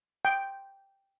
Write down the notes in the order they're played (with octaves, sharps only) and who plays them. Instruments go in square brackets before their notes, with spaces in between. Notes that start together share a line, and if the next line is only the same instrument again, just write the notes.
[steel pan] G5